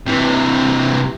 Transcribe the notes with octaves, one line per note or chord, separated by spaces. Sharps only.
C3 E3